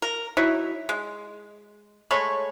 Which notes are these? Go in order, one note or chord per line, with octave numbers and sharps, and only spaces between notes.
A#4
F#3 D#4 E4
G#3
G#3 A3 C#5 B5